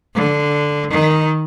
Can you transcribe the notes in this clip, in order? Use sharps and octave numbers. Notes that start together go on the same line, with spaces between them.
D3
D#3